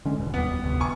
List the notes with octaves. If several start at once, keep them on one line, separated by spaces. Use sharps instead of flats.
D3 G#3 C#4
E1 A1 B2
F1 D#2 G3 B3
F1 D2 C3
G#5 C#6